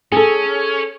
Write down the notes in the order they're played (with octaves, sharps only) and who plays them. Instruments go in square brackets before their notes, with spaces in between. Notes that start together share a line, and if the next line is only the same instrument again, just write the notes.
[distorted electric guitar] C#4 [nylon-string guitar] G#4 A4